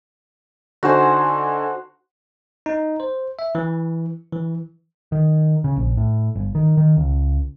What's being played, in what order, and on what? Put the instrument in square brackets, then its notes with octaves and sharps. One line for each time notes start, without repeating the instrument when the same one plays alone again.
[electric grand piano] D3 D#4 G#5 [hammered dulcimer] F#4 C5
[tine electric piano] D#4
C5
E5
E3
E3
[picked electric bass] D#3
C#3
A#1
A2
G1
D#3
D#3
C#2